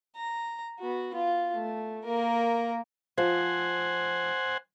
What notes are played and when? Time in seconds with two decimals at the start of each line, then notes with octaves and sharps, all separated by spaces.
0.16 A#5
0.79 B3 F#4
1.14 F4
1.55 A3
2.04 A#3 A#4
3.18 F3 C5 F#5 G#5